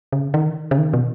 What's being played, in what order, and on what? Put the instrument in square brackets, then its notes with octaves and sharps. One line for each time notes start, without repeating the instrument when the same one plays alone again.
[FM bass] C#3
D#3
C#3
D#3
B2